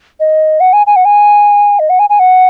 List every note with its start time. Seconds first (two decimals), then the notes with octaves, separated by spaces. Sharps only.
0.20 D#5
0.60 F#5
0.73 G#5
0.87 G#5
0.96 F#5
1.05 G#5
1.79 D#5
1.90 F#5
1.99 G#5
2.10 G#5
2.20 F#5